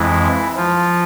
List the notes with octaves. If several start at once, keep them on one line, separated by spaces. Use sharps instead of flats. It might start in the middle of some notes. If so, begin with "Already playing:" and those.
Already playing: F2 E3 G#3 E4
F3 F4